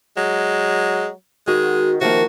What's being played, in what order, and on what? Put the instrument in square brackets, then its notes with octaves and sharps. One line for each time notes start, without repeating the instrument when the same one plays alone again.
[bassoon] F#3 [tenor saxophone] G#3
[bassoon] D#3 [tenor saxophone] G#3 [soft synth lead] F#4 [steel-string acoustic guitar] G#5
[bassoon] C3 [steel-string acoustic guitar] D#3 F3 A#3 [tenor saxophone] F#4